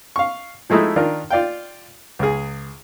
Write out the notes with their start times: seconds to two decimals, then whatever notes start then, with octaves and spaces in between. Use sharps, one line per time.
0.16 F5 C#6
0.70 F3 G#3 A3 D#4 E4
0.96 D#3 D4 F4 A#4
1.30 F4 D5 F5 G5
2.19 C#2 G#4